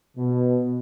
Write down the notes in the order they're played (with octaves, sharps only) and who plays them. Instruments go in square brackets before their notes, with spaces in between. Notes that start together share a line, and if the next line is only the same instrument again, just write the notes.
[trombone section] B2